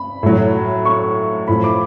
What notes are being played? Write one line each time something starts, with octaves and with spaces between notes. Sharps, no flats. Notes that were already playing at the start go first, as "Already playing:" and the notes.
Already playing: B5
A2 F#3
C#6
A2 F3 B5
D6